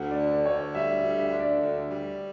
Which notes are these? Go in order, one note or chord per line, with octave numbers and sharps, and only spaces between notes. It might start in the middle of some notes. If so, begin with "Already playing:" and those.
Already playing: D2 F#5
D5
D3
D5
D2 C#5
D5
G3 E5
E5
D2
E5
D3
D5
D2
G3